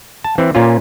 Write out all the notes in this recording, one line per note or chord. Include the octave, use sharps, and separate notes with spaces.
A5
E3 C4
A#2 C#4 F4